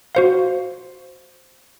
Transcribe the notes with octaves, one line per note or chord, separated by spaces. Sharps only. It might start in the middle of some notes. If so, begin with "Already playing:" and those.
F#4 C5 F5